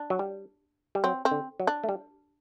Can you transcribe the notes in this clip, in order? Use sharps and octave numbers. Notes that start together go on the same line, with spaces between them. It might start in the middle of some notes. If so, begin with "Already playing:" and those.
Already playing: D4
F#3
G3
G3
F#3 C4
C4
D3
F#3
D4
A3
G3